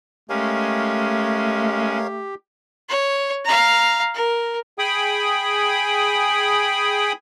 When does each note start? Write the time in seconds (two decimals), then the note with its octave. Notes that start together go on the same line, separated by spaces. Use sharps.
0.30 G#3 A3 C#4 G4 A#4 C#5 F5
2.89 C#5
3.45 F5 A#5
4.15 A#4
4.79 G#4 G5 G#5 B5 D#6